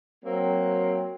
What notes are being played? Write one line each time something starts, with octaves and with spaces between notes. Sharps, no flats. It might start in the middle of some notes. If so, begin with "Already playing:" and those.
F#3 A#3 C4